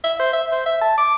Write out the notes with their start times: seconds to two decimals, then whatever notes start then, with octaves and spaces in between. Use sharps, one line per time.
0.04 E5
0.20 C5
0.33 E5
0.52 C5
0.66 E5
0.81 A5
0.98 D6